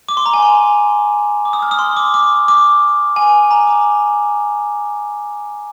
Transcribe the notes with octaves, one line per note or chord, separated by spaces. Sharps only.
D6
C6
A#5
G#5
C6
D6
D#6
F6
D#6
C6
D6
D6
D6
G#5
A#5
D6